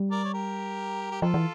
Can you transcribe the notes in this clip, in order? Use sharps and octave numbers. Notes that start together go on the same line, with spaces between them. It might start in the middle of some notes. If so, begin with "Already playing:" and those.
Already playing: G3
A#4 D5
C#5
G4 A#4
G4
F3 F4 A4
E3